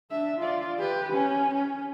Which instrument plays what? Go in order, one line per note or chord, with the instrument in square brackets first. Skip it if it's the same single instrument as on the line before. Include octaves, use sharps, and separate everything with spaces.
[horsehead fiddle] D4 E5
F4 D5
G4 B4
C#4
C#4